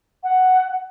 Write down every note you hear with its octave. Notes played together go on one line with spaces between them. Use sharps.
F#5